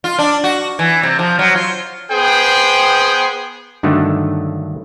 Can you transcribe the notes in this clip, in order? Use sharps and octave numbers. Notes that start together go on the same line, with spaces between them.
F4
D4
F#4
E3
C3
F3
F#3
F4
B3 G#4 C5 G5
G2 D3 D#3 F#3 A3